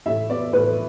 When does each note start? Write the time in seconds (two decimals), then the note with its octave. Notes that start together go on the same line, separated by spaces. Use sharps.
0.06 A2 E5
0.30 B3 D5
0.53 A2 B4